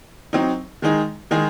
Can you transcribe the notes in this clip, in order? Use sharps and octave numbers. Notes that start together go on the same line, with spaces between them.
F#3 C4 D#4
D#3 G#3 D#4 G#4
D#3 G#3 D#4 G#4